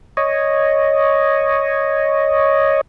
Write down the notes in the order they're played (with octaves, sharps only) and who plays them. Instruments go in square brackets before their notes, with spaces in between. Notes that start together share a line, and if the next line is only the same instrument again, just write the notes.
[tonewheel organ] C#5 D#5